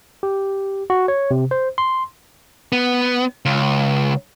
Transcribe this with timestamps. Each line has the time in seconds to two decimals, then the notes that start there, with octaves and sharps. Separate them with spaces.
0.23 G4
0.90 F#4
1.08 C#5
1.31 C3
1.51 C5
1.78 C6
2.72 B3
3.45 C#2